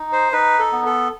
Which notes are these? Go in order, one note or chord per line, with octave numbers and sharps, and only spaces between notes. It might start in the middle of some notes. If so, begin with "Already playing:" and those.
Already playing: D#4
C5
D#4 B4
A4
B3
A4